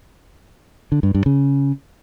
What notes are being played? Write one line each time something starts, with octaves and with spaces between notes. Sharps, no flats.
D3
G2
G2
C#3